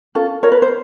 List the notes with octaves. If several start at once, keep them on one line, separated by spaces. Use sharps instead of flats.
C#4 F4 A4
F4 A#4 C#5
B4
C5